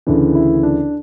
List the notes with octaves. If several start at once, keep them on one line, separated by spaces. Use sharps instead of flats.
D2 C#3 E3 D4
E4
D4